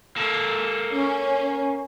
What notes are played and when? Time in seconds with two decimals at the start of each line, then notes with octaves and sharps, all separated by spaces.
0.17 A#3 A4
0.92 C#4